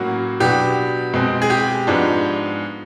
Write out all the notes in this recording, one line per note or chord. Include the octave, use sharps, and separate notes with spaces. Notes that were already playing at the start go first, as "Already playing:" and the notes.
Already playing: A2 F#3 A#3 C#4 F#4
B2 F#3 B3 D4 G4
B2 G#3 C4
G#4
G4
G#2 F3 G#3 B3 D4